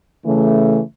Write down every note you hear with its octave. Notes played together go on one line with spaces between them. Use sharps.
C#3 E3 A3